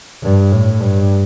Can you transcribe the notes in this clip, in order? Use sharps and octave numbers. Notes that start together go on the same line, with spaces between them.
G2
A2
G2